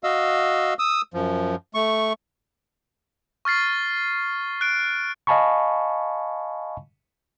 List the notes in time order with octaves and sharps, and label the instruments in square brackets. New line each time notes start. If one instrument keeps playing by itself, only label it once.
[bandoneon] F#4 D#5 F5 E6
D#6 E6
F#2 F3
A3 C#6
[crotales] C#6 F6 A6 C7
F#6 D7
[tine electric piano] D#5 F5 G#5 A5 B5 C#6